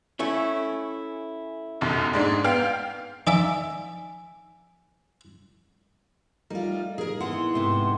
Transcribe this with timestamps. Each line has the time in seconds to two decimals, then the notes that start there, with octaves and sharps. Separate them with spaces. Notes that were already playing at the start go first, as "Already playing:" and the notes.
0.19 A3 C#4 E4
1.81 F1 B1 F#2
2.13 G#2 G#3 D4
2.44 B3 F5 G5 F6
3.27 F3 D#4 D5 E5 G#5
6.50 G3 A3 D#4 F4 A#4
6.98 A2 G3 D#4 G#4 A#4
7.20 E3 A#3 B3 D#4 F#5 C6
7.54 G#2 C3 A3